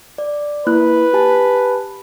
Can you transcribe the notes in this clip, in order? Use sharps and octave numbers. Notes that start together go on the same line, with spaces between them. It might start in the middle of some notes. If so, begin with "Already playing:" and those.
D5
A#3 E4 B4 F#6
G4 G#5 A5